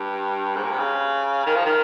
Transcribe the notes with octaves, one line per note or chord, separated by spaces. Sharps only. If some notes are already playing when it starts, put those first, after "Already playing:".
Already playing: G2
G#2
A#2
C3
C#3
D#3
F3
D#3